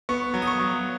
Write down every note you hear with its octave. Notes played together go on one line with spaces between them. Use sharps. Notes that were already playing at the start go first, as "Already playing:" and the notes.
B3 C#6
F#3
D#6
C#6
F#3